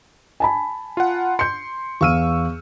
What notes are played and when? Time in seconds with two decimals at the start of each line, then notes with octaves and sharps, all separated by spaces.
0.40 G#5 A5 B5
0.97 F4 F#5
1.39 C6 G6 C#7
2.01 E2 F5 C#6 E6 F6 D#7